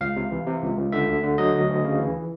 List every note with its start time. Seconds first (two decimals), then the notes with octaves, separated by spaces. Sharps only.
0.01 C#2 F5
0.16 C3
0.31 E3
0.47 C3
0.62 C#2
0.77 C#2
0.92 D3 E5
1.07 D2
1.23 D3
1.38 F#3 D#5
1.53 D2
1.69 D2
1.84 C#3
1.99 E3